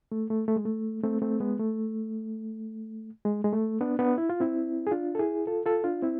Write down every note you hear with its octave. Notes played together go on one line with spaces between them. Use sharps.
A3
A3
A3
G#3
A3
A3 C4
A3 C4
G#3 B3
A3
G#3
G#3
A3
B3 D4
B3 D4
E4
F4
C4 E4
G#4
D4 F4
A4
E4 G#4
F4 A4
F4 A4
D4 F4
C4 E4